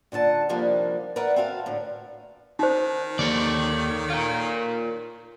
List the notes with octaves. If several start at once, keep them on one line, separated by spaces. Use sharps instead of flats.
A#2 D3 F#5 A5
C3 D#3 F3 G3 A#3 D4
A#4 B4 D5 E5 F#5
C4 F#4 E5 F5 A5
A2 D3
D#3 D#4 C5
D#2 A4 C#5 D5
F4 A#4